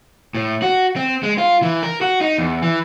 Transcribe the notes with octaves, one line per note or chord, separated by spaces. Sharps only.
A2
F#4
C4
G#3
F4
E3
A#4
F#4
D#4
E2
E3